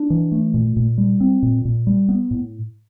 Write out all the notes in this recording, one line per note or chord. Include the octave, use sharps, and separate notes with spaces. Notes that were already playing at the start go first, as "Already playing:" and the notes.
Already playing: D4
E3
A3
A#2
A#2
G3
C4
A#2
A#2
G3
B3
A2